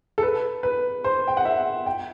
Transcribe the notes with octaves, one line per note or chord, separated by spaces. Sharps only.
A4
B4
B4
C5
G5
F#5
E5
G5